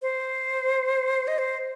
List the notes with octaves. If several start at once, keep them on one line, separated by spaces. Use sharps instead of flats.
C5
D#5
C5